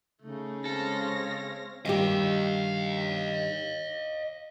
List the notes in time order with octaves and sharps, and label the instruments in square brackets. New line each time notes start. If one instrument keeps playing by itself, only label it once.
[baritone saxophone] C#3 [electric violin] A3 D#4
[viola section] G#3 C4 C#5 [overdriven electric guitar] A4 [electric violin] F5 A#6
[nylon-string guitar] G2 D#3 G4 [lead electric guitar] D#5 F5